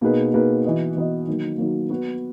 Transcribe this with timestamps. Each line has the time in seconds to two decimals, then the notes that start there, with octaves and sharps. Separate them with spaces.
0.01 B2 A#3 D#4 G#4 B4
0.34 B2 A#3 D#4 G#4 B4
0.64 E3 B3 F#4 B4 D#5
0.97 E3 B3 F#4 B4 D#5
1.28 D#3 F#3 A#3
1.58 D#3 F#3 A#3
1.89 B3 F#4 B4